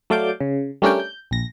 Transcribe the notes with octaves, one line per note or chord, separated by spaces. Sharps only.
F#3 A3 D5 F5 D6 G6
C#3
G3 A3 C#4 D4 A#4 G5
G6
A#1 A#6